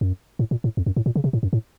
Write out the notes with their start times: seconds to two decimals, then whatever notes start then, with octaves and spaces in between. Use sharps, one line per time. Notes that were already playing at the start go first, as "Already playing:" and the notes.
0.01 F#2
0.39 A2
0.51 A#2
0.64 A2
0.77 F2
0.86 F#2
0.96 A2
1.06 A#2
1.16 C#3
1.24 C3
1.33 A2
1.43 F#2
1.53 A2